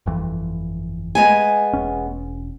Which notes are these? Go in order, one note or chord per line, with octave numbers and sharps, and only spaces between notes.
G1 F2 E3
G#3 B3 G#5
E1 C#4